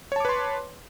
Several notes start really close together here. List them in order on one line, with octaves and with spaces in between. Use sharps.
C#5 A5 D6 B4 C6